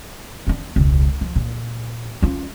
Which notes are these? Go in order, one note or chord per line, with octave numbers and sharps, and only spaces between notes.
B3 D4
E1 C#2
F3
A#2
C#4 F4